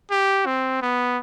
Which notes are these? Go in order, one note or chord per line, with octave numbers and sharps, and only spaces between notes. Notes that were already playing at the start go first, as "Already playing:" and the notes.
G4
C4
B3